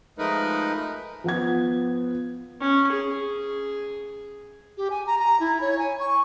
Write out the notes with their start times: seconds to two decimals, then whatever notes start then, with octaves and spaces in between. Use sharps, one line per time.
0.18 F3 G#3 A3 D#4 A#4 B4
1.24 F3 B3 G#6
2.60 C#4
2.92 G#4
4.77 G4
4.90 G#5
5.07 A#5
5.19 A#5
5.40 E4
5.61 C#5
5.79 G#5
6.00 C#6